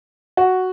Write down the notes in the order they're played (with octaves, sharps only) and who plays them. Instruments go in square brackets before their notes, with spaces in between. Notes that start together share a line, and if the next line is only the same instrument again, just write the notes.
[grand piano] F#4